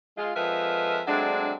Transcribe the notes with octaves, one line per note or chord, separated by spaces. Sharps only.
G#3 F4
F2 F3 G#3 A#4 B4 E5
F#3 G#3 A3 C4 D4